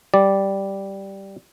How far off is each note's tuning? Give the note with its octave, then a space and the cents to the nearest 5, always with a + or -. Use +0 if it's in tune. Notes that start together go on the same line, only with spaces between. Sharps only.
G3 -5 D5 +0